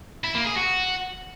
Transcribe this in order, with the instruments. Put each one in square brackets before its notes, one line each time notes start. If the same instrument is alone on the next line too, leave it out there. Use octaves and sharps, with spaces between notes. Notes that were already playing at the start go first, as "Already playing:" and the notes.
[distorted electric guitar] E4
A#3
G#4
F#4